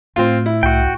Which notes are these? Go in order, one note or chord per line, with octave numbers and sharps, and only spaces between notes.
A2 C4 F4
E4
C2 F#4 G5